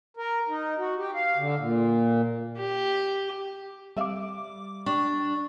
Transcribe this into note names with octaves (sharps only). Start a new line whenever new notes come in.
A#4
D#4
F#4
G4
F5
D3
A#2
G4
G3 C4 E5 F5 D6
D4 G4 C#6